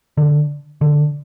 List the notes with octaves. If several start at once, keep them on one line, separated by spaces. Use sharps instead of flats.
D3
D3